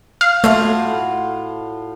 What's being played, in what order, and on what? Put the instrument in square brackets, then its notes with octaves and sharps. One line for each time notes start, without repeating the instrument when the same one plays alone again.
[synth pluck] F5
[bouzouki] A2 F4 F#4 [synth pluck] A3